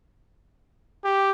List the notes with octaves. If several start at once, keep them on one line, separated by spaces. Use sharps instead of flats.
G4